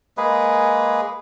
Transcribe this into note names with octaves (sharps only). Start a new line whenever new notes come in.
G#3 A#3 G#4 B4